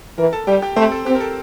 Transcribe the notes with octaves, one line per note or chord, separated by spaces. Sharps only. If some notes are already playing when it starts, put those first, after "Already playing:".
E3 A#4 A#5
A4 A5
G3 G4 G5
G4 G5
A3 C4 C5
A4
C4 G4
A#4
A4